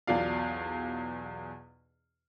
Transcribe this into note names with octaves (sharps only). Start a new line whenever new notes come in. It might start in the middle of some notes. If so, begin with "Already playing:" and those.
B1 E2 B2 F4 D5 F5